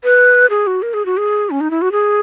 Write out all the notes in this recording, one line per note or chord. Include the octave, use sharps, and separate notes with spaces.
B4
G#4
F#4
A#4
G#4
F#4
G#4
C#4
D#4
E4
F#4
G#4